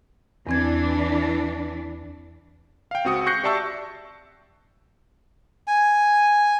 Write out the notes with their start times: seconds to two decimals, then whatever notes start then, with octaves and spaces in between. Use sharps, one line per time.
0.47 E2 E3 C4 D4 G#6
2.91 F5 G5
3.04 C#2 C4 F#4 D#6 C#7
3.26 C#6 F#6 G6 A#6 C7 C#7
3.43 G4 D5 E5 A5 C#6 E6
5.67 G#5